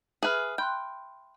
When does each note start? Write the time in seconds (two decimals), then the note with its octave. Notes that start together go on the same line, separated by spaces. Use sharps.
0.23 G#4 B4 E5 F6
0.58 G5 B5 C6 F#6